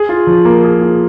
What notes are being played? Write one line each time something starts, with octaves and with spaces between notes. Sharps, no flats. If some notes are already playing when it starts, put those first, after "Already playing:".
Already playing: G#4
F4
F3
A#3
G#4
F4